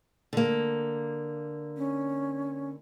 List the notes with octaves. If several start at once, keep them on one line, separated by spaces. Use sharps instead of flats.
D3 A#3
C#4